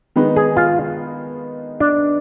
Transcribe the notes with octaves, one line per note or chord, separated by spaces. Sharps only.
D#3 G#3 B3 D#4 B4
G#4
F4
D4